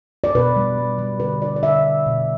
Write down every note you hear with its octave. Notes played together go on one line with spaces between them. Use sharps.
D5
B2 B4
G3
G3
G3
D3 B4
G3 D5
D5
D3 E5
D3
B2